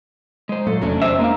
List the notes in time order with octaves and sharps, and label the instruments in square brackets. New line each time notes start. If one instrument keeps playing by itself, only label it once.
[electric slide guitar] G#3 C5
[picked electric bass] A#2 F#3 A3 [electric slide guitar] A4
[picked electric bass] F1 E2 A3 [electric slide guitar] F#3 C#4 D4
[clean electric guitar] C5 E5
[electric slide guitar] G#3 D4 F5 [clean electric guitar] A#3